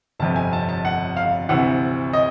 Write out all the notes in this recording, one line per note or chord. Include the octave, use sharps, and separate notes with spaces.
G1 F2 C3 A5
G#5
A5
A5
F#5
F5
D2 C3 E3 F#5
D#5